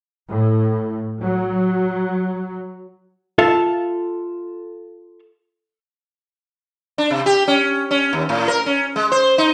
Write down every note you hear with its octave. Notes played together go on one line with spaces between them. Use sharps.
A2
F#3
F4 A4 E5
D4
C3
G4
C#4
C#4
D#2
A2
A#4
C#4
G#3
C5
D#4